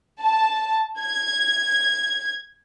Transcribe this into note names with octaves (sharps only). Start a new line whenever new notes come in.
A5
G#6